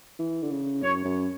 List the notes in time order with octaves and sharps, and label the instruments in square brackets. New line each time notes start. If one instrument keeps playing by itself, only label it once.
[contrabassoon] E3
D3
C#3
[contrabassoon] F#2 [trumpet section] C#5
[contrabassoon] F#2